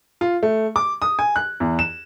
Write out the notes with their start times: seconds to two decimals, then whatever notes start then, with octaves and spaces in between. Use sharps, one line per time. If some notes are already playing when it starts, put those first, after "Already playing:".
0.21 F4
0.43 A3
0.76 D6
1.02 D#6
1.19 G#5
1.36 F#6
1.60 E2
1.79 E7